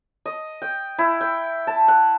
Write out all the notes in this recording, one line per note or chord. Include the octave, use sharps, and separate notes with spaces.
D#5
G5
E4
G5
A5
F#5